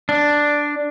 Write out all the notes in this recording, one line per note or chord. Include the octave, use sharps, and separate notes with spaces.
D4